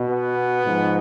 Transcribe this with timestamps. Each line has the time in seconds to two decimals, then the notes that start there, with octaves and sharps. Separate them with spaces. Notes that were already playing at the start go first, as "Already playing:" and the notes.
Already playing: B2
0.10 B3
0.65 G#2 F3